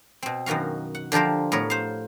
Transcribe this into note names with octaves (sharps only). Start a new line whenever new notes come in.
B2 C4
F#2 B2 D#3 F#4 F5
F#5
D3 F3 G4 A#4 C5
A2 B3 A#4 C#5
C5 F5